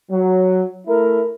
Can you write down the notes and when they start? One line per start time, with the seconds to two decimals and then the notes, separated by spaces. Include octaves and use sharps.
0.11 F#3
0.88 A3 E4 A#4